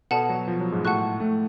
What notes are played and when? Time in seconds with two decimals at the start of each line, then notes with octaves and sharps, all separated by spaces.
0.11 B2 B3 A4 D5 F#5 A5
0.29 F#3
0.48 F3
0.60 F#3
0.72 G#2 G#3
0.85 A2 A3 F#5 A5 C#6 F#6
1.20 A2 A3